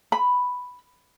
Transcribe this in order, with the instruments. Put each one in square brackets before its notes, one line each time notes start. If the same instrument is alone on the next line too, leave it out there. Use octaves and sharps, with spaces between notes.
[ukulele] B5